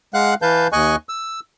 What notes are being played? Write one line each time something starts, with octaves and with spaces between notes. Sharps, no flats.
G#3 F5 F#5 F#6
E3 B4 F5 A5 G6
D#2 D#5 G#5 C#6 F#6
E6